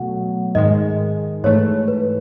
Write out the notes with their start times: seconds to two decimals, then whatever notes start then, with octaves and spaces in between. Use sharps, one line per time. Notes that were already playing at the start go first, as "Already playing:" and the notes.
Already playing: B2 F#3 A3 F#5
0.55 G#2 D#3 G#3 D#5
1.44 G#2 E3 A3 C#5
1.88 B4